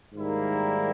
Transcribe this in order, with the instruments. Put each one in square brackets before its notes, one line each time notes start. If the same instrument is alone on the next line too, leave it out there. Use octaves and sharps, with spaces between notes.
[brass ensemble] G#2 D#3 G3 A#3 E4